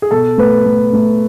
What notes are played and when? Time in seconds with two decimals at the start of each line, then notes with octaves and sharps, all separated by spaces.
0.02 G#4
0.11 B2 A4
0.38 A3 B4
0.65 A3
0.93 A3